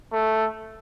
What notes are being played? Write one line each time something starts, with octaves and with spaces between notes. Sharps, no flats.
A3